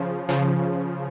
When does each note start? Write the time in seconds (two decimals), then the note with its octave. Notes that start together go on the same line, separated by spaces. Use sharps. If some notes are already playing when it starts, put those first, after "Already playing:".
Already playing: C#3 F3
0.29 C#3 F3